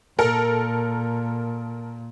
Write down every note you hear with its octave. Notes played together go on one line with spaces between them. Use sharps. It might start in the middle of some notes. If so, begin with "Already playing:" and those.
A#2 A4 A#4